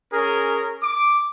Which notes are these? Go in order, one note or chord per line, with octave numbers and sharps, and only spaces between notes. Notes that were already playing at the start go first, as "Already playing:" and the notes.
C#4 G#4 A#4
D6